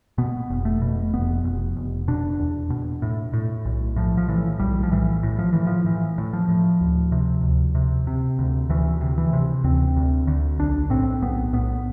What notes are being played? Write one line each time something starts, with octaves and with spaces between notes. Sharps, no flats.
B2 B3
F1
A3
B2
F1 B3
F1
F1
B2 D4
E2
B2
A2
A2
B1
A2 F3
F3
A2 E3
B1 G3
F3
A2 E3
A2
F3
A2 E3
F3
A2 E3
A2
F3
A2
D2
C3
D2
C3
C3
D2
D2 E3
C3
E3
C3
D2 C4
D2
D2
B1 D4
A2 C4
B1 B3
A2 B3